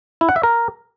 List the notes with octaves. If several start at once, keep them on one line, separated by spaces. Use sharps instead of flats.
E4
F#5
E5
A#4